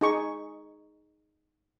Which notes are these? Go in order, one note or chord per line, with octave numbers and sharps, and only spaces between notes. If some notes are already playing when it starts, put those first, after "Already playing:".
D#4 G#4 C#6